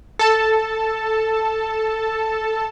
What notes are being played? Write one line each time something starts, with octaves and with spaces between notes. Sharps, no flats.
A4 A5